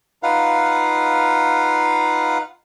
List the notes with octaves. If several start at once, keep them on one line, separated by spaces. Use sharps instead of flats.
D#4 F4 B4 F5 F#5